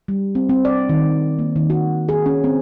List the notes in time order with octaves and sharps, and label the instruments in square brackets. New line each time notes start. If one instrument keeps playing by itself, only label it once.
[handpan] G3
C4
C4
D5
D#3
A#3
D#3
F#4
G#4
C#4
C4